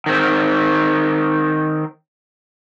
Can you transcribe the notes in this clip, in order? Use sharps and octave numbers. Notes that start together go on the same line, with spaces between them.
D#3 C4